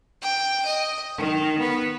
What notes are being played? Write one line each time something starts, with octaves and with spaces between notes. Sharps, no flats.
G5
D#5
D#3
B3